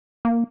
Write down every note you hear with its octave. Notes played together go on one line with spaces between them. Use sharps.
A#3